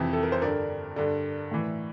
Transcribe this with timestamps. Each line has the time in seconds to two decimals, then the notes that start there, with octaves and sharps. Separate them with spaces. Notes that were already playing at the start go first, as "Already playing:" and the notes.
Already playing: F2 C3 E3 E5
0.13 A4
0.23 A#4
0.32 C5
0.41 G2 D3 A#4 D5
0.96 G2 D3
1.51 A2 E3